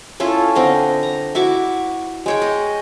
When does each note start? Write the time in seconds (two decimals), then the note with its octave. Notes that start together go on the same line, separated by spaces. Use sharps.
0.20 C#4 E4 F4 A4
0.55 D3 C4 D#5 A#5
1.03 A#5
1.35 E4 F#4 C#6 D6
2.26 G#3 C#5 G5
2.42 D#5